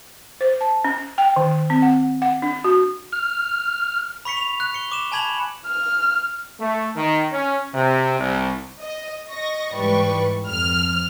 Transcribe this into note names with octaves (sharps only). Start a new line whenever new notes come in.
C5
A5
C#4
G5
D#3
C4
F#5
F#5
D4
F#4
F6
B5 C#6 B6 C#7
F7
F#6
C#7 G7
D6 E7
G#5 A5 B5 G#6 E7 F#7
F6
A3
D#3
C#4
C3
C2
D#5
D#5 C#6 A#6
G#2 E3 G3 B4 C#6
F2 F6